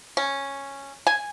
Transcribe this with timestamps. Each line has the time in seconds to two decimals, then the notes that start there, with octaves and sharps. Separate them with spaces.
0.17 C#4
1.07 G#5